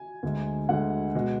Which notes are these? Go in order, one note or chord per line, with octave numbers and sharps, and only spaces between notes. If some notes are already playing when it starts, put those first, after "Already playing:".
Already playing: G#5
D2 D3 G#3
D2 D3 G#3 F#5
B2 G#3